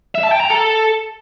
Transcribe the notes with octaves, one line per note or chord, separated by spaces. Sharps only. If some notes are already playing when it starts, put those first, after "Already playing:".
E5
A5
G5
A#5
A4